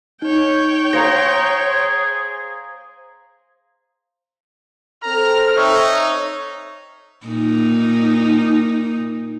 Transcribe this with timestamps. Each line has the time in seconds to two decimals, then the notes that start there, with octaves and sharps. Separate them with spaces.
0.22 D#4 C#5 G5
0.93 G#4 C5 F5 A#5 A#6
5.04 C4 A4 A#5 F6
5.57 D#4 C#5 E5
7.27 A#2 D#4